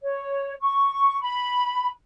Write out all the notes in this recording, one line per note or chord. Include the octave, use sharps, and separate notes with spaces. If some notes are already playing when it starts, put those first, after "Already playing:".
C#5
C#6
B5